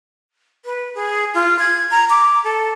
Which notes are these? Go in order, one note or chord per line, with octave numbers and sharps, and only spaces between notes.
B4
G#4
F4
G#6
A#5
D6
A4